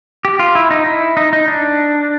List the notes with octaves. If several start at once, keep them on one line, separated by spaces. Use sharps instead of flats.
G4
F4
E4
D#4
E4
D#4
D#4
D4